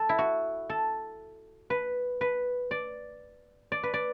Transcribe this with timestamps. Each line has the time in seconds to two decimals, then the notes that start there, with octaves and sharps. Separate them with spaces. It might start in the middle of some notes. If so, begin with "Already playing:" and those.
Already playing: A4
0.09 E4
0.18 F#4
0.69 A4
1.70 B4
2.21 B4
2.71 D5
3.72 D5
3.83 B4
3.94 D5